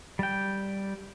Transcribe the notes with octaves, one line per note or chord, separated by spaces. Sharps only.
G3 G5